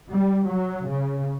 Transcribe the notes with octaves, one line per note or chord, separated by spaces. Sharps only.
G3
F#3
C#3